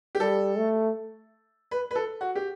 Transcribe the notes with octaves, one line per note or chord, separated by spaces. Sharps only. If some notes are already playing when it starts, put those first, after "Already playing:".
G4
G3 A4
A3
B4
B4
A4
F#4
G4